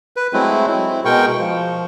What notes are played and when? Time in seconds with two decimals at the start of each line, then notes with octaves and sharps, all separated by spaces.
0.16 B4
0.33 F#3 G#3 A3 C4 E4
0.67 C4 E4
1.05 B2 G#3 A#4 G5 C#6
1.39 F3